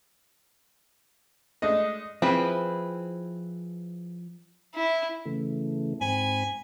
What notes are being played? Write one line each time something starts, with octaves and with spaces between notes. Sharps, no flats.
G#3 A3 D4 D#5
F3 C4 E4 G#4 B4
E4
C#3 E3 A3
G#2 C4 G#5 B5